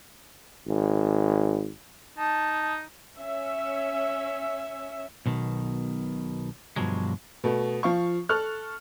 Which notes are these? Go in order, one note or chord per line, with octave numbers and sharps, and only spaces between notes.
G#1
D#4 A5
C#4 E5
B1 B2 D#3
G2 B2 D3 F3 F#3 G#3
B2 A3
F3 F5 C#6
A4 C#6 F6 F#6